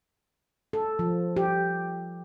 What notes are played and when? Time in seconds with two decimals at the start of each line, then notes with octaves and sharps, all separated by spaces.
0.73 A4
0.99 F3
1.37 G4